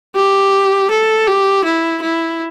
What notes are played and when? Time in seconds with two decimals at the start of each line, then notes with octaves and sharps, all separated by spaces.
0.15 G4
0.90 A4
1.27 G4
1.64 E4
2.02 E4